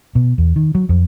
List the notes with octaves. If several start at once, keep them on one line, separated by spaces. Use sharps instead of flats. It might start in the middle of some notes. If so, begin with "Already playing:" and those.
B2
E2
D#3
F#3
F2